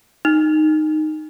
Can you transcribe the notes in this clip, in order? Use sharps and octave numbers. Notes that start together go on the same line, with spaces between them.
D#4